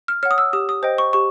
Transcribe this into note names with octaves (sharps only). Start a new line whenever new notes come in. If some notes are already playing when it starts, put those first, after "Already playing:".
F6
C#5 F#5 F6
D#6
E6
G4 D#6
D#6
C5 D#5 G5
C#6
G4 C#6